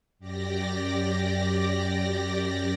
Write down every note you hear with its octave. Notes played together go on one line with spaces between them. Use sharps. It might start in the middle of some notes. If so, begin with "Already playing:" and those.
F#2 G4 D5 A#6